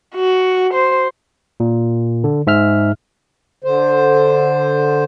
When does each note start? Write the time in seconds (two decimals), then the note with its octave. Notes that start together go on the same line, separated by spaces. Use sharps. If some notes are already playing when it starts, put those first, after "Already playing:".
0.15 F#4
0.74 C5
1.60 A#2
2.24 D3
2.47 G#2 E5 F6
3.64 D3 C5